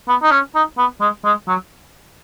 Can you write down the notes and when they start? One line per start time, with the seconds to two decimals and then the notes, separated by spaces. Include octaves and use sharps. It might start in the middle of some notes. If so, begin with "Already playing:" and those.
0.08 B3
0.22 D#4
0.31 C#4
0.55 D#4
0.78 B3
1.01 G#3
1.24 G#3
1.47 F#3